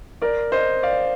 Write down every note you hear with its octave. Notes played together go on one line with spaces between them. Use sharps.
A#4 D5
C5 D#5
D5 F5